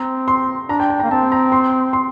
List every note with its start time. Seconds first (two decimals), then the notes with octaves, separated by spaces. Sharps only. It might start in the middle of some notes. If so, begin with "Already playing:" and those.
Already playing: C4 A#5
0.28 C6
0.69 D4 A#5
0.80 G5
0.90 G5
1.00 A#5
1.03 A#3
1.11 C4 A5
1.32 A#5
1.52 C6
1.93 C6